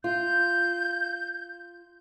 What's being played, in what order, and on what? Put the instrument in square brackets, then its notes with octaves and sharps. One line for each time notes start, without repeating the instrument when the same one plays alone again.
[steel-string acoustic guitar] F4 [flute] G6